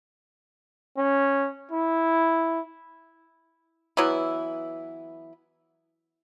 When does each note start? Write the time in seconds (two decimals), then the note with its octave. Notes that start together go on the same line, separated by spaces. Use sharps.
0.98 C#4
1.72 E4
3.97 E3 F#3 B3 E4